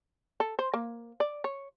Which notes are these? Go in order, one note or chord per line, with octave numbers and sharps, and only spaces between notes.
A4
C5
A#3
D5
C#5